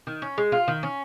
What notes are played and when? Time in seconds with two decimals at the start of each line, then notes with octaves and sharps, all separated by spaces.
0.07 D#3
0.22 C#4
0.38 G#3
0.52 F4
0.68 D#3
0.83 C#4